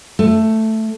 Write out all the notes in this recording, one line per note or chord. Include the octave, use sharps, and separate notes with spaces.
A3